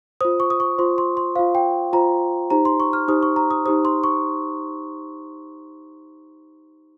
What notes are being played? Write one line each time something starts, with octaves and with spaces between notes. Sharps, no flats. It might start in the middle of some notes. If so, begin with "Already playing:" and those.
F4 C5 D#6
C#6
D#6
C#6
F4 C5 C6
C6
C6
F4 C5 F5
G5
F4 C5 A#5
D#4 G4 C5 A#5
C6
C#6
F6
D#4 G4 C5 D#6
C#6
A#5
D#6
D#4 G4 C5 D#6
C6
C#6